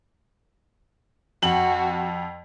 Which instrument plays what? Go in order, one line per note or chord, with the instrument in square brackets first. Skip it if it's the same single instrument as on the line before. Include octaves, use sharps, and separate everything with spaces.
[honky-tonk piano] F2 F#7 [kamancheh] F#4